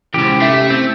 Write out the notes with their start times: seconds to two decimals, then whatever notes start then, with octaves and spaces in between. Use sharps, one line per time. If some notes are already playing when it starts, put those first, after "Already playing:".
0.14 D#2 G#2 C3 C#4 E4 G4
0.40 A3 E5 B6 C7
0.70 C4